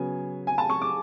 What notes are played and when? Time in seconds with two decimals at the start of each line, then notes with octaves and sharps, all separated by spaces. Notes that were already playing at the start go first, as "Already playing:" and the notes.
Already playing: C#3 F#3 B3 G#5
0.47 G#5
0.58 A5
0.70 C#6
0.82 D6